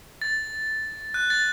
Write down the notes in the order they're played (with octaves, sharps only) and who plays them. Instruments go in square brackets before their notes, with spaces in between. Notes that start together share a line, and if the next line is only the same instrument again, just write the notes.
[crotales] A6
F#6
A6